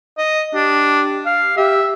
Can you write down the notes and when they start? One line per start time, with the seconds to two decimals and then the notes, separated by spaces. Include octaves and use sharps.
0.18 D#5
0.54 D4 G4
1.26 F5
1.57 G4 E5